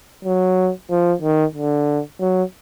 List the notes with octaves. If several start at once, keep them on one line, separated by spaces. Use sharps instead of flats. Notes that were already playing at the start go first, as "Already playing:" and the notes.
F#3
F3
D#3
D3
F#3